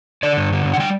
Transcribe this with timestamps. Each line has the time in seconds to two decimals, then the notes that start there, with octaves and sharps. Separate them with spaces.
0.23 D3 D5
0.37 G2
0.52 D3
0.65 G2
0.73 F#5
0.79 G3 G5